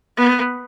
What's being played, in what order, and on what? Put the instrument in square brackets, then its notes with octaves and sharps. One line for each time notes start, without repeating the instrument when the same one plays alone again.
[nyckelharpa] B3